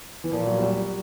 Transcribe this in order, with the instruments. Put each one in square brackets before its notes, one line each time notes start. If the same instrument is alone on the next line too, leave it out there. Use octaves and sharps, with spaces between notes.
[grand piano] E3
[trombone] A#2 [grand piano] F3
[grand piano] F#3
G3
F#3